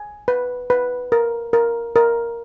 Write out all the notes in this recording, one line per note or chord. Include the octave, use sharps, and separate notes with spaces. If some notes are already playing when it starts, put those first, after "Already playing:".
Already playing: G#5
B4
B4
A#4
A#4
A#4